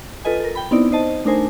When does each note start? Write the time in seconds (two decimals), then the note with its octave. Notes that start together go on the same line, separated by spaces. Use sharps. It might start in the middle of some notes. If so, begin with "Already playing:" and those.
0.25 F4 A4 B4 D#5 G#5
0.40 A4 A#4
0.55 G5 B5
0.71 B3 C4 D#4 E4 D5
0.92 D#4 C5 D#5 A5
1.25 A3 D4 D#4 A#4 C5 G#5